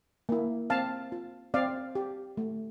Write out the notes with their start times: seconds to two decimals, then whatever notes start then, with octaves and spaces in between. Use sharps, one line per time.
0.29 A#3 E4
0.70 C4 F5 A5
1.12 F4
1.54 C4 D5 F5
1.95 G4
2.37 A3